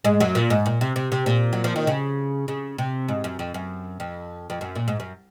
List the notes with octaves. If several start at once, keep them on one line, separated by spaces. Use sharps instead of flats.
G#2 G#3
F#2 F#3
A#2
G#2
A#2
C3
C3
C3
A#2
F#3
F3
D#3
C#3
C#3
C3
G#2
F#2
F2
F#2
F2
F2
F#2
A#2
G#2
F#2